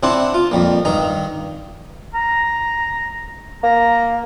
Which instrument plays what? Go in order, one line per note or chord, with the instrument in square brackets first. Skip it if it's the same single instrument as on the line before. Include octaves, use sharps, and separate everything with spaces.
[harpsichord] C3 D4 E4 F#5 C6 D6
F4
F2 G3 A#3
G2 D#3 D#4 A#5
[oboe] A#5
[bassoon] A#3 [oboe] A#5